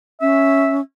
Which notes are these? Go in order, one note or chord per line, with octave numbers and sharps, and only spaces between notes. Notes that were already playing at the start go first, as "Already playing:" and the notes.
C#4 E5